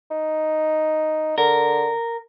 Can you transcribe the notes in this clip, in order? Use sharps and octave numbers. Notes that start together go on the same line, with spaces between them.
D#4
D3 A#4